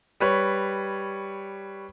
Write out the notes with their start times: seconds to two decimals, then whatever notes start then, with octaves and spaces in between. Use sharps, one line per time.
0.20 G3 B4 C#5